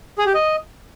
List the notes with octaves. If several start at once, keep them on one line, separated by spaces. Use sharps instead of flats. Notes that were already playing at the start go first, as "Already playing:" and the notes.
G#4
G4
D#5